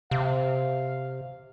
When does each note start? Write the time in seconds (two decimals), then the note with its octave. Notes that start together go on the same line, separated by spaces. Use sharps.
0.11 C3 F5